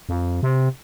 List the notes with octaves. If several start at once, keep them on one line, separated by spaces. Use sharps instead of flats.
F2
C3